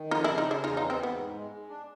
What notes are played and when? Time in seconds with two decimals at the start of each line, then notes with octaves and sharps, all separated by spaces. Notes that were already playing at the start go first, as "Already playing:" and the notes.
Already playing: D#3
0.11 F2 D#4 F4
0.24 D4 E4
0.29 C#3
0.38 D#4 F4
0.46 C#3 D4 E4
0.64 E2 D#4 F4
0.77 D#4 F4
0.82 E3
0.90 C4
0.98 E2
1.03 B3
1.16 G#2
1.34 G#3
1.51 G#3
1.69 D4